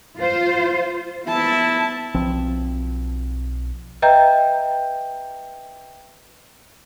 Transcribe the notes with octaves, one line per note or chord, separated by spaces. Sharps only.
F4 C5
B3 E4 A5
B1 F3 C4
B4 D#5 E5 G5 A#5 G6